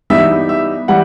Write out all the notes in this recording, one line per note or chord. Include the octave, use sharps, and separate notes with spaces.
E3 G3 B3 D#4 E5
E5
E3 G3 F#5